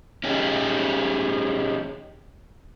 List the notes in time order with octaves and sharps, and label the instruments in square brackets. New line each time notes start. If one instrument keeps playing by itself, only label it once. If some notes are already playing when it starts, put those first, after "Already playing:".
[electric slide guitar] C#4 D#4 G4 G#4